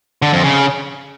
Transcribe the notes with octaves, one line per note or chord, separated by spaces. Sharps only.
D3
F2
C#3